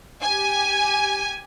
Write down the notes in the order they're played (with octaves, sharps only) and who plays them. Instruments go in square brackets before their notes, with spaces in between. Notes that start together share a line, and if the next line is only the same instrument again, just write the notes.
[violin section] G4 G#5